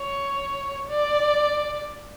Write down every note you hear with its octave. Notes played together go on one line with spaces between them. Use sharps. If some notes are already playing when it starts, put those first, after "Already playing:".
Already playing: C#5
D5